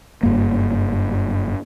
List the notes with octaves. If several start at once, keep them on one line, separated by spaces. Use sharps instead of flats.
F#1 G2 A#3